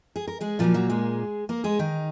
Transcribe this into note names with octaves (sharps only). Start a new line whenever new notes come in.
G#4
A#4
G#3 G#4
A#2 F3 F#3 A#3 F4
F#3 F#4
G#3 G#4
A#3 A#4
G#3 G#4
D#3 D#4